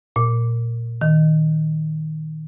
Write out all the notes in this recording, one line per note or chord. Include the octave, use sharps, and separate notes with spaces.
A#2
D#3